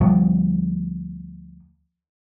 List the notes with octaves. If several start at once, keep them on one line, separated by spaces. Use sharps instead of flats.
D2 F3 G3 B3